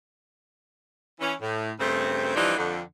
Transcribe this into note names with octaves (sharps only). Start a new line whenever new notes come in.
E3 C#4
A2
G2 C#3 A3 C4
E3 F3 G3 C4 D4 D#4
F2 D3